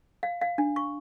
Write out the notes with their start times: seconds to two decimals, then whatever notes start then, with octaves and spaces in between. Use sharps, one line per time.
0.23 F5
0.41 F5
0.58 D4
0.76 C#6